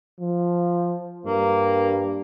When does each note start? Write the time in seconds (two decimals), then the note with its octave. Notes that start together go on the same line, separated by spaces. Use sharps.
0.20 F3
1.26 G2 A#3